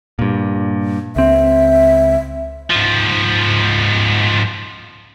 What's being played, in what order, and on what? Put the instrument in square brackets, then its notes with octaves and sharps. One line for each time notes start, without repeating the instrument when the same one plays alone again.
[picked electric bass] G2 A#2
[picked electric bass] C#2 C4 [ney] E5
[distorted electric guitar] G#2 F3